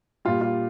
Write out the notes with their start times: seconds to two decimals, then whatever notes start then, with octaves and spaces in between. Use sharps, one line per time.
0.25 A#2 G3 F4
0.41 F4